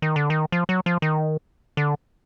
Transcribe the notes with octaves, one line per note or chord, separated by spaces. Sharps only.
D#3
D3
D#3
F3
F#3
F3
D#3
D3